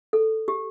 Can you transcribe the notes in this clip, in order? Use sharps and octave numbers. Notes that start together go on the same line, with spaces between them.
A4
G4